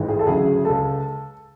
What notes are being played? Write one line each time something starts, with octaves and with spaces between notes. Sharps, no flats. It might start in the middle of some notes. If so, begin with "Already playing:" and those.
Already playing: A1 G#2 E3 G#3
G#4
A4
D2 C#3 F#3 G#4
C#2 C#3 G#3 A4